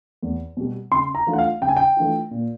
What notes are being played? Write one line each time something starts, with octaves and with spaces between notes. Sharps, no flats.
E2
B2 G3
C#3 C6
A#5
E3 A3 D4 F4
F#5
F5
C#3 G5
G#5
G5
E3 A3 D4 F4
A#2